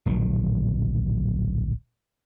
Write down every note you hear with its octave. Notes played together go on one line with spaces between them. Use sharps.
D1 A#1 D#3 F#3